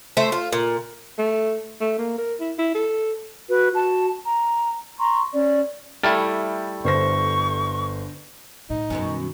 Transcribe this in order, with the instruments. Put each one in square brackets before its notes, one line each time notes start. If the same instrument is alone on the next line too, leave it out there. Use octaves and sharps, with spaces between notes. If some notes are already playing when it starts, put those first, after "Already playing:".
[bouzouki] A3 C5 E5
F4
A#2
[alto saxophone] A3
A3
A#3
A#4
E4
E4
A4
[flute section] F#4 B4
F#4 A5
A#5
A#5 C6 C#6
C#4 D5
[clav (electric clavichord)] G3 A3 E4 [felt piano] G5 F6 A6
[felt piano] G1 C5 A#6 [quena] C#6
[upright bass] A2 D3 [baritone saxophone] D#4
[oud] F#2 B2 C#4 [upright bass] D#3